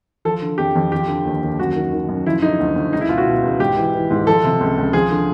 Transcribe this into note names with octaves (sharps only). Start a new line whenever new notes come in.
F3 A4
D3
F2 G4
F2
F3 G4
D3
D#2
D#2
F#2 F#4
D#3
D#3
F#2
F3 E4
D3 D#4
D2
D2
C#2 D#4
E4
B2 F4
F#4
B2
C#2
G#2 G4
E3
E3
G#2
F3 A4
C3
C#2
C#2
F3 G#4
D3